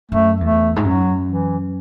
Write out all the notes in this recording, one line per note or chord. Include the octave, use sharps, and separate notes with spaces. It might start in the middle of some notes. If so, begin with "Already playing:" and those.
F#2 A3
E2 A3
G#2
F#2 F#3
E3